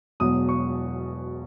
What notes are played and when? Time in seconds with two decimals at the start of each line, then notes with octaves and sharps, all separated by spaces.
0.20 E1 E2 B2 F#3 D#6
0.49 C#6